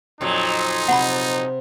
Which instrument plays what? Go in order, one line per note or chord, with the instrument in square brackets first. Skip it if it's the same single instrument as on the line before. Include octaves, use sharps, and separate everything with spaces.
[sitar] F2 A#2 F#3 [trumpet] D#4
[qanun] C3 C4 [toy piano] F#5 B5